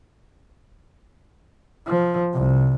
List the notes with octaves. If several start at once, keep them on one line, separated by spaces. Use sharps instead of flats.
F3
C2